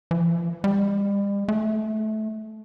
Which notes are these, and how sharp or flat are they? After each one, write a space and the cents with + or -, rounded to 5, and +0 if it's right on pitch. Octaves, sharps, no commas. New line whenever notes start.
F3 -45
G3 +40
A3 -20